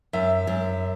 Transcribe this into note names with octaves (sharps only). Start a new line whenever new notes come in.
F#2 E5
F#2